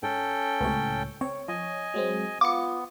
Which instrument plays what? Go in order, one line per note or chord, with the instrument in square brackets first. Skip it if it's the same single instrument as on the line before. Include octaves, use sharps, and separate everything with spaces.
[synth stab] G#2 [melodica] C#4 A4 G5
[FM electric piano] C#2 A2 C#5 [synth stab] C3 B3
[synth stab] C4 [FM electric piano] C#5
[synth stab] F3 [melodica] D#5 G#5
[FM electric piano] F#3 G#3 C4
[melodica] B3 [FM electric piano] F4 [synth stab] D6 C#7